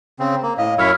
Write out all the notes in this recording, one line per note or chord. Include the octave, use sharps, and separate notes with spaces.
C#3 C4
A#3
A2 D#5 F5
F#2 E4 C#5 E6 F6 B6